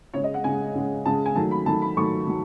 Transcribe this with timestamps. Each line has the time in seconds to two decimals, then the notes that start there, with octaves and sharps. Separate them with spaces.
0.14 C#3 G#3 C#5
0.24 D#5
0.34 F#5
0.44 C#3 G#3 G#5
0.75 C#3 G#3
1.05 C#3 G#3 A5
1.26 G#5
1.36 D#3 F#3 A3 A5
1.51 B5
1.66 D#3 F#3 A3 A5
1.82 B5
1.97 D#3 F#3 A3 C#6
2.27 D#3 F#3